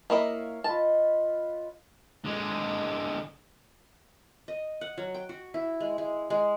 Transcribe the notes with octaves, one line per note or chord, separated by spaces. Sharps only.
A#3 E4 C#5 D#5 F5
F4 B4 D#5 A5
D3 G#3
D#5
F#5
F#3
G5
F#4
E4
G#3
G#3
G#3